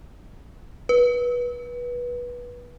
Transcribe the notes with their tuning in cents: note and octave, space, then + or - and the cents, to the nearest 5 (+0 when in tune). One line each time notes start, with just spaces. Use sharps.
B4 -20